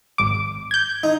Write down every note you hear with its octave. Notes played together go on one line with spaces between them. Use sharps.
G#1 D6
G6 G#6
D#4